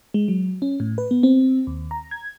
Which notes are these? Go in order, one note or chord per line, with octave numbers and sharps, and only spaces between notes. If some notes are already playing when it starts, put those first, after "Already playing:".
G#3
F#3
C#4
A2
B4
B3
C4
D#2
A#5
G#6